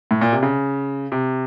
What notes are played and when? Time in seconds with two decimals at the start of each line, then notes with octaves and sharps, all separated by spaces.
0.11 A2
0.21 A#2
0.33 C3
0.43 C#3
1.12 C3